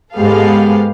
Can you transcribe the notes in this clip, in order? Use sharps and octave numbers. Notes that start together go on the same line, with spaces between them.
G#2 G#3 B3 G4 A4 F5